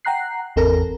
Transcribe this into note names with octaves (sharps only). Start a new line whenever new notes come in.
F#5 G5 A#5 F#6 C7
G#1 E2 C4 A4 A#4 A#6